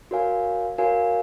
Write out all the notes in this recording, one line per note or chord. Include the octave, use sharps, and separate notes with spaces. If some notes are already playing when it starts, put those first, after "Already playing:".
F#4 A#4 C#5 F5 G#5
F#4 A#4 C#5 F5 G#5